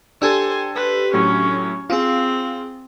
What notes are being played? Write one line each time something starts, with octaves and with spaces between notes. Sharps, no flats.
D4 G4 A4 C5 G#5 E6
B4 C5
A2 F#3 C#4
C4 F4 G#4 F5